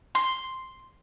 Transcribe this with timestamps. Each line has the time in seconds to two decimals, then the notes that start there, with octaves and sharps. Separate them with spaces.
0.15 C6